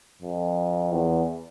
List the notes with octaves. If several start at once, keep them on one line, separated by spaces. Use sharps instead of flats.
F2
E2